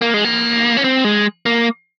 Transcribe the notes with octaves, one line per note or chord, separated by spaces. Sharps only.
A#3
G#3
A#3
C#4
C4
G#3
A#3